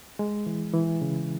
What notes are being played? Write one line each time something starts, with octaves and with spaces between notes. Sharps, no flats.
G#3
E3
E3
C#3